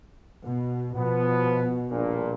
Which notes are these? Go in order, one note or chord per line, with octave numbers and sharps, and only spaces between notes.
B2
B2 F3 B3
A#1 G2 A#2